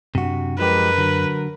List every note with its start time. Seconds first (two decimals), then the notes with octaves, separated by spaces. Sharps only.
0.15 F#2 C3 D4 F#4
0.59 F3 G#3 G4 A#4 B4
0.98 D3 F#3